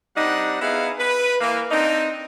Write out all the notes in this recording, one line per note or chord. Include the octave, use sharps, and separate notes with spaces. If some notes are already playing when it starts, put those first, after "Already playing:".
G3 C4 D4 D#4 F#5
B3 D#4 E4 G#4 F5
B4
E3 A#3
C4 D4 D#4